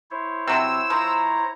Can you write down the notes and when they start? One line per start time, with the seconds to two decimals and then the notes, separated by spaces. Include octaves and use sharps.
0.11 E4 C5 C#5
0.47 C3 F#3 E6
0.90 F3 A#5